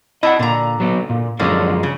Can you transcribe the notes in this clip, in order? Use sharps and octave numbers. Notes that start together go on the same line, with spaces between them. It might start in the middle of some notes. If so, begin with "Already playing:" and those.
E4 D#5 F#5 A5
A#2 D3 A#5
F#3 B3
A#2
F#2 D3 F3 G#3 A#3 C#4
C#3